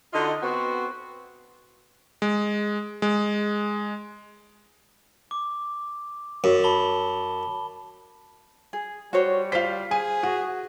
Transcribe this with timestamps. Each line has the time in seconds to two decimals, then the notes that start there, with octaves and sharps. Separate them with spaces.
0.13 D3 D#4 F4 F#4 D#5
0.42 B3 C4 F#4
2.22 G#3
3.02 G#3
5.31 D6
6.44 F#2
6.64 A5 B5 G7
8.73 G#4
9.13 G3 F#4 C5 C#5
9.52 F4 C5 F5 B6
9.91 G#4 G#5
10.23 F#4